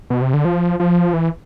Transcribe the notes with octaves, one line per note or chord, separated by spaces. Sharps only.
B2
C3
D3
F3
F3
E3